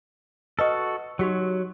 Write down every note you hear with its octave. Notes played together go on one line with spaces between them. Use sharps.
F#4 A4 B4 D#5 D#6
F#3 D#4 F#4 G4